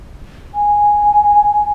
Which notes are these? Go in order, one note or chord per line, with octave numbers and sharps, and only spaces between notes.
G#5